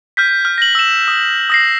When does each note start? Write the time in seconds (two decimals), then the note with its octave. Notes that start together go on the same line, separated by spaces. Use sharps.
0.17 F6 G6 B6
0.45 F6
0.58 A#6 F#7
0.75 E6 E7
1.08 D#6
1.50 D#6 A#6 C7